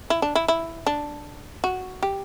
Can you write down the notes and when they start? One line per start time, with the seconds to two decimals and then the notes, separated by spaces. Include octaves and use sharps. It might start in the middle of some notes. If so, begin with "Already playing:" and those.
0.10 E4
0.22 D4
0.35 E4
0.48 E4
0.87 D4
1.64 F#4
2.03 G4